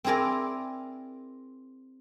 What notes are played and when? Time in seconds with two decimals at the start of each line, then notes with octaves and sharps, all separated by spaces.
0.04 C4 E4 G#4 A#4 D5